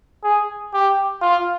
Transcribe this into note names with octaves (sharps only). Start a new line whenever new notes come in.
G#4
G4
F4